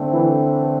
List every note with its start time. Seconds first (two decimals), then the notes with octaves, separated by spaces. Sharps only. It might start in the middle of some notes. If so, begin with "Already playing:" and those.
Already playing: D3 A3 C4
0.12 E3 E4